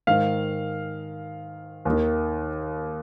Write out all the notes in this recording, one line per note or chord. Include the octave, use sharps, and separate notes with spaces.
G#2 D#3 F5
D#2 D#3